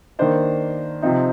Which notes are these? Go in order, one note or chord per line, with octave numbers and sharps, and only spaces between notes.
D#3 A#3 D4 C5
C3 F3 C4 D#4